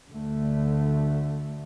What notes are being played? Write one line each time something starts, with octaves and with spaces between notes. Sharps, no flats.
D2 D3 A3